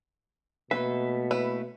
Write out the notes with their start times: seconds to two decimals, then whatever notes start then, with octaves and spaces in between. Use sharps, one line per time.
0.71 B2 A3 A#3 B4 E5
1.31 E4 B4